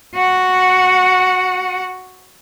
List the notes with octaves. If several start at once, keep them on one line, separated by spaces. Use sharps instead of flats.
F#4 F#5